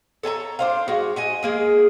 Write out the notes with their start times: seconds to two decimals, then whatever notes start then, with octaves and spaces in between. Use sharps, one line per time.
0.23 A4 C#5 A5 A#5
0.59 D4 C5 F5
0.88 G#3 F#4
1.16 F#4 D#5 G#5
1.43 G#3 A#3 G#4